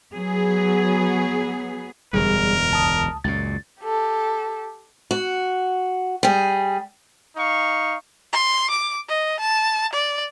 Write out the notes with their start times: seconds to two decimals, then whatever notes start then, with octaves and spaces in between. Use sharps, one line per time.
0.14 F#3 B3 G#4
2.13 E1 F#2 D3 G3 G#4 A#4
2.71 C#2 A5 D#6
3.24 C#2 F#2 A#2 A6
3.81 G4 A4
5.11 F#4
6.23 G3 G#4
7.37 D#4 F5 C#6
8.33 C6
8.70 D6
9.09 D#5
9.40 A5
9.93 D5